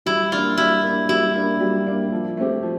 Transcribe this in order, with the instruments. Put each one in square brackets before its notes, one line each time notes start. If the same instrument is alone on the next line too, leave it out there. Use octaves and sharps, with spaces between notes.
[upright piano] G3 [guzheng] E4
[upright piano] A#3 D4 [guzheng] F4
[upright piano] G3 [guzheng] E4
[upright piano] A#3
D4
[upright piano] G3 [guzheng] E4
[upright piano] A#3 D4
G3
A#3 D4
F3
A3 C4 G4
F3